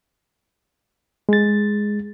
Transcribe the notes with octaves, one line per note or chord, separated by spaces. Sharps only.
G#3 A6